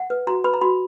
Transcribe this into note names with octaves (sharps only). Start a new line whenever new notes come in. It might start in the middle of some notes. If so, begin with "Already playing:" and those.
Already playing: F#5
B4
F#4 A#5
B4 B5
A#5
F#4 B5